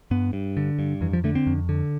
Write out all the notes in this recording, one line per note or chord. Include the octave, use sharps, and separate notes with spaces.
G2 B3
G2
D3
G2
F2 E3
F3
D3 A3
C4
F2
D3